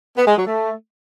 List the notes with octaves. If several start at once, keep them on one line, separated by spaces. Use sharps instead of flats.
B3
G#3
F#3
A3